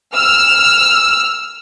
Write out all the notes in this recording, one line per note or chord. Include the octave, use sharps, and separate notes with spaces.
E6 F6